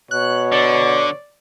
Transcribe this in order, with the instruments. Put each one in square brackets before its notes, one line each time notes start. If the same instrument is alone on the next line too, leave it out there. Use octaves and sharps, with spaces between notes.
[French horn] B2 [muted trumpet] C#5 [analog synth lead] F#6
[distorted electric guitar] D3 [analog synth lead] D5